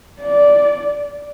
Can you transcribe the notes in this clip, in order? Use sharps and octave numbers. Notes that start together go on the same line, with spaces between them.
D5